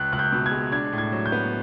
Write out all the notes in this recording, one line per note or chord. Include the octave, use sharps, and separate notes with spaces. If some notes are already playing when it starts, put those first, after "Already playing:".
Already playing: C#2 F#6
C#2 F#6
G6
B2
G#6
G#3
D4 G#6
A2
G#6
F#3
G6
B3